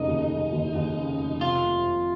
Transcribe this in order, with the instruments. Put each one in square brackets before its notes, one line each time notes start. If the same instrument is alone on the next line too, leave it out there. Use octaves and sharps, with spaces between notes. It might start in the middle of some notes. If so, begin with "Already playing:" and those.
Already playing: [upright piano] F1 C#3 [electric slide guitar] D#4
[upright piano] D#2
F1
D#2
D#2
C#3
F1
[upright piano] C3 [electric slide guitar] F4
[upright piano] F1
F1